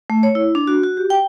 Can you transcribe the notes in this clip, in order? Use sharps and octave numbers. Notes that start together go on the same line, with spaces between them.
A3
C#5
E4
D4
F#4
F#4
G4
G5